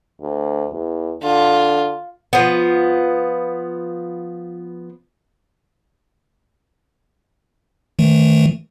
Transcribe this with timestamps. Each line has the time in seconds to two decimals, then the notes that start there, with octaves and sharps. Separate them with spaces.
0.21 D2
0.72 E2
1.23 D3 F4
2.33 F3 B3
7.99 D#3 E3 A3